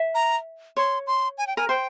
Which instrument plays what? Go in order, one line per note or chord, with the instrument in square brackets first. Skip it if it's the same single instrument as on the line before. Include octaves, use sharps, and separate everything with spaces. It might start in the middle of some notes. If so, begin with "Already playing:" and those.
Already playing: [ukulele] E5
[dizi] A#5
[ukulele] C#5 [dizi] C6
[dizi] C6
G#5
G5
[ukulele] A#4 [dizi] G#5
[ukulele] C5 [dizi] G5